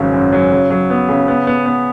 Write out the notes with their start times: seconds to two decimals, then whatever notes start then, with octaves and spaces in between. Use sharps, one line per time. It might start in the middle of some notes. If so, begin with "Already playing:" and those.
Already playing: G#1 C#3 F#3
0.13 F#2
0.32 F#3
0.51 C#3
0.70 F#3
0.90 B3
1.09 C#3
1.28 B3
1.47 B3
1.66 B3